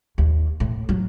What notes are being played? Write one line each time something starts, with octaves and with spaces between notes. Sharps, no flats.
D#2
A2
F#3